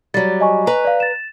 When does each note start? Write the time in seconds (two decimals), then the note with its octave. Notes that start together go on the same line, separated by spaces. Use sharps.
0.14 F#3 G3 A6
0.41 D#5 G#5 C#6
0.67 B4 A#5
0.85 D5 F5
1.00 A6 E7